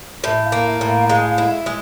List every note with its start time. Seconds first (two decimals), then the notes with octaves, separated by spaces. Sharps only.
0.24 A2 E5
0.45 F5
0.52 A#3
0.67 E5
0.81 A2
0.89 F5
1.09 G#3 F5
1.30 F5
1.38 E4
1.51 E5
1.66 G#3